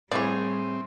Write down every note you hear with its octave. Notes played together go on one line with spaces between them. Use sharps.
A2 G3 C4 E4 G#4 C#5 D5